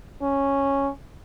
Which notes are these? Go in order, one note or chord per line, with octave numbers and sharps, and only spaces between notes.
C#4